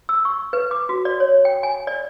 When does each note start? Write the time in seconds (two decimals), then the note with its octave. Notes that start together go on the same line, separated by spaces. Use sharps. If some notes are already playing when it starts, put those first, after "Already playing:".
0.09 E6
0.25 C#6
0.53 B4
0.71 D6
0.89 F#4
1.05 D5
1.20 C#5
1.45 G5
1.63 G#5
1.87 D5